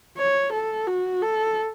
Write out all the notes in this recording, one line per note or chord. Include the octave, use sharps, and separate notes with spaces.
C#5
A4
F#4
A4